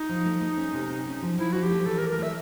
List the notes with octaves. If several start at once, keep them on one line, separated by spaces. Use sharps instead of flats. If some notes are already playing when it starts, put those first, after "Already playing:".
Already playing: D#4
F3
A3
A3
C#4
C3
C#4
C#4
F3
F3 E4
F3 F#4
G4
A3
E3 A4
A#4
A3
A#4
A3 E5